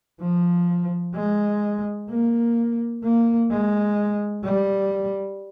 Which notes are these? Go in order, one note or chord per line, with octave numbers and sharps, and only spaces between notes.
F3
G#3
A#3
A#3
G#3
G3